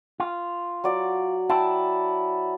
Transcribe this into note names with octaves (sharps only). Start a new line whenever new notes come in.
F4
F#3 D5
E4 G5 A5